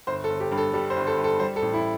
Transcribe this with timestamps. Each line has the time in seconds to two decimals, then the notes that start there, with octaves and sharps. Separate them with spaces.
0.07 G1 C5
0.24 A4
0.30 G1
0.40 G4
0.51 G2
0.57 A4
0.73 G3 A4
0.90 C5
0.96 G1
1.07 A4
1.18 G1
1.24 A4
1.40 G3 C5
1.56 A4
1.62 A1
1.73 E4